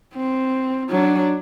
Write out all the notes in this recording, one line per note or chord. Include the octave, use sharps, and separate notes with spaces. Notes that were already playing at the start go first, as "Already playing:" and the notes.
C4
F#3 D4